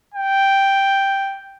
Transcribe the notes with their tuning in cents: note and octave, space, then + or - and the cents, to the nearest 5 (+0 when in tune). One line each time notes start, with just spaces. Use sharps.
G5 +0